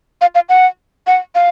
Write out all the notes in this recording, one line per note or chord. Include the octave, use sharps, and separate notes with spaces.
F5
F5
F#5
F#5
F5